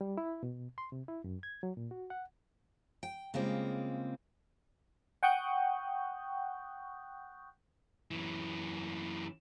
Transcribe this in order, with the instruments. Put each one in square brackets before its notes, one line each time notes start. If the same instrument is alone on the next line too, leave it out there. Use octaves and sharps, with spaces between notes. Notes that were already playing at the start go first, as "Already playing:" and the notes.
[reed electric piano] G3
E4
B2
C6
C3
E4
F#2
G#6
F#3
A#2
F#4
F#5
[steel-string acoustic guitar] G5
C#3 G3 G#3 A#3 C4 F4
[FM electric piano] F#5 G5 C#6 D#6 F#6 G6
[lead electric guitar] F#2 E3